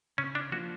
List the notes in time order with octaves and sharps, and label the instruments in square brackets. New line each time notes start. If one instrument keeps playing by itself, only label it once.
[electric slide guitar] C#3 [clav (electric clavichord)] C#4
[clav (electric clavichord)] D4
[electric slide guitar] F3 A#3 D4 F4 [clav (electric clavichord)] F#4